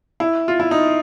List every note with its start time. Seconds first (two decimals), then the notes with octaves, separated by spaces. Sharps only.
0.20 E4
0.48 F4
0.60 E4
0.71 D#4